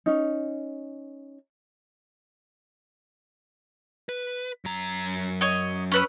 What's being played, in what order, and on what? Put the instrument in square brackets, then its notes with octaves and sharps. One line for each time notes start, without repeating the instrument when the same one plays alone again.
[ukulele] C#4 D#4
[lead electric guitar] B4
F#2 A#5
[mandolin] C#5 D#5
C#4 B4 E6